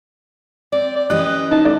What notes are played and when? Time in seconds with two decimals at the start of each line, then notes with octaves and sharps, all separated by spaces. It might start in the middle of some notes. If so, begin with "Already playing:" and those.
0.72 C4 D5
0.96 D5
1.10 E3 C#4 G4 D#5 F#6
1.51 D#4 A5
1.65 A3 D5